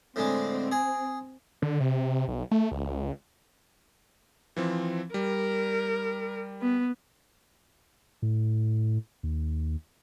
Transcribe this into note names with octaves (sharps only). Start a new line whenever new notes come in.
A2 D3 G#3 C4
G#4
D3
C3
B1
A3
C#2
E3 F3 C4
G3 A#4
B3
A2
D#2